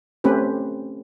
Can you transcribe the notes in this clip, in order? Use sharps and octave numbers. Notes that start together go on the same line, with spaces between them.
A3 C4 C#4 G4 B4